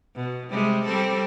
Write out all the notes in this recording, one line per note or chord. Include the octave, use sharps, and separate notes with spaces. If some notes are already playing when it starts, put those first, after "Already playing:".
B2
C3 G3 G#3
G3 C4 A4